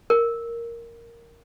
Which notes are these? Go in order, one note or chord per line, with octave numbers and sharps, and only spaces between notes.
A#4